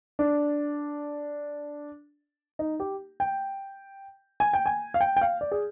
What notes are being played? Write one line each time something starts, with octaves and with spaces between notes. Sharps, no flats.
D4
D#4
G4
G5
G#5
G5
G#5
F5
G5
G5
F5
D5
G#4